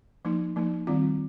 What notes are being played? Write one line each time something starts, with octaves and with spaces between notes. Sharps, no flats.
F3 A#3 D#4
F3 A#3 D#4
D#3 G3 C4 F4